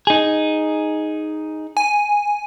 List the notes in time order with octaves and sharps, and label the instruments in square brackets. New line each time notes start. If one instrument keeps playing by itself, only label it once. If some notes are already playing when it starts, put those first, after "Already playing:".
[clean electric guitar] D#4 G#4
[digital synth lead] G#5